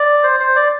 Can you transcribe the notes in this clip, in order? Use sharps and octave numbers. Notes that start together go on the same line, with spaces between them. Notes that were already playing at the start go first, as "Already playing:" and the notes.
Already playing: D5
C5
C5
D5